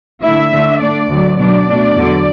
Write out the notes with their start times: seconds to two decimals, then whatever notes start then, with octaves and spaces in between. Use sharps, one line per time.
0.23 D3 A3 E4 E5
0.52 D3 A3 D4
0.81 D3 A3 D4 D5
1.10 D2 D3 F#3
1.38 B2 F#3 D4 D5
1.68 B2 A3 D4
1.96 E2 D3 F#3